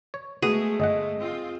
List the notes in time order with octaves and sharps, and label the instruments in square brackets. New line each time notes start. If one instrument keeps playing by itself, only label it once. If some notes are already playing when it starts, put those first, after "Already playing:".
[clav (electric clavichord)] C#5
[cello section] G#3 A3 [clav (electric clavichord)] B3 F#4 [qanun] G#4
[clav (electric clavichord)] G1 F#5 [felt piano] D#5
[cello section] C4 F4